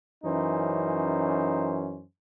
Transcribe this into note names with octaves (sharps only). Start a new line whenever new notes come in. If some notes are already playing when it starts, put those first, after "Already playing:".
F#2 E3 C#4 D#4 C5